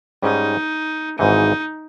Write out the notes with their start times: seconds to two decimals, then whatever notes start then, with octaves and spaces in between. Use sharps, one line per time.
0.22 G#2 G3 C#4 D#4 G#4
1.18 G#1 G#2 E3 D#4